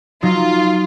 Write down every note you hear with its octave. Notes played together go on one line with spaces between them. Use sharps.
F#3 D#4 F4